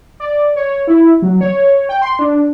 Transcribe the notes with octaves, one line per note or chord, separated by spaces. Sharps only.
D5
C#5
E4
F#3
C#5
G5
C6
D4